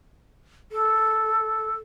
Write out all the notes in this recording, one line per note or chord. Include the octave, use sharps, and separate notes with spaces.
A4